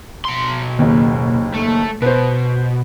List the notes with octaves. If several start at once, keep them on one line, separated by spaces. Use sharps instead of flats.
B2 C6
F#1 D#2
A3
B2 B4 C5